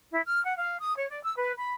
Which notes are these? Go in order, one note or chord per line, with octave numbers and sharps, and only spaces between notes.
E4
F6
F#5
F5
D#6
C#5
D5
E6
B4
B5